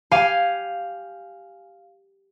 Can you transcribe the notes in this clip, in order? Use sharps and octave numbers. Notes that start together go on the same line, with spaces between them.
G4 F5 G#5